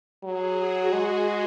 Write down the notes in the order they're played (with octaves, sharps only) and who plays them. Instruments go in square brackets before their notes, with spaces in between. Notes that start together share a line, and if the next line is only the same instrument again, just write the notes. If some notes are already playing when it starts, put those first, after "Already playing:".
[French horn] F#3 [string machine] G#4
[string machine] F#4
[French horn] G#3 [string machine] G#4